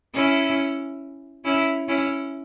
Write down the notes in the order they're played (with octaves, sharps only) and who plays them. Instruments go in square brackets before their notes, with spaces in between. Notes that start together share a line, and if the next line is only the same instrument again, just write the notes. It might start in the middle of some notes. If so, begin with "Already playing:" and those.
[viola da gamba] C#4 E4
C#4 E4
C#4 E4